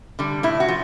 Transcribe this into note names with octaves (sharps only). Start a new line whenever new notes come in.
D3 G3
A2 E4
F#4
F3